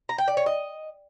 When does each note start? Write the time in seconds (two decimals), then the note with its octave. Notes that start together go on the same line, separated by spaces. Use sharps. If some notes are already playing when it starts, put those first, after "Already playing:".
0.09 A#5
0.18 G5
0.28 D5
0.37 C#5
0.46 D#5